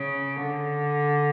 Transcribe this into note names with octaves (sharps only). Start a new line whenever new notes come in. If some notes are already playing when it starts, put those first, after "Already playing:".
Already playing: C#3
D3